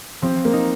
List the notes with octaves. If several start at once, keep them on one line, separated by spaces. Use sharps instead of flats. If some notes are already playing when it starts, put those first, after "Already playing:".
F3 C4
A#3
D#4